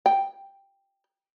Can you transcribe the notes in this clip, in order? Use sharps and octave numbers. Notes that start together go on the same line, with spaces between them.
G5